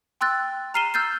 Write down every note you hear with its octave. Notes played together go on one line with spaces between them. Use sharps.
G5 C6 E6 F#6 A6
A#5 F6 C7 D#7 E7 G7
E6 F6 G6 A6 C7